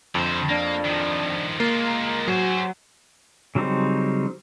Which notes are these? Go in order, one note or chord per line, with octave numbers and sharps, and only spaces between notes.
F2 D3 C5
A#3 D4
D#3 F3
G#3 A#3 F4
A#5
F#3 F#4 G#4 C5
C#3 F#3 G3 C4 D#4